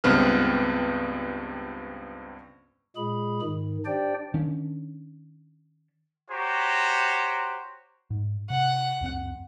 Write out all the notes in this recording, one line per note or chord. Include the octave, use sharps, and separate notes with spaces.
C#2 G2 B3 C4 B4 F6
A#2 G#3 G#4 B5
G#2 D#3
D4 G4 C5 D5 G5
D#3 C#4 D4
F#4 G4 C5 C#5 A#5
G#2
C3 F#5
C#2 F#2 C4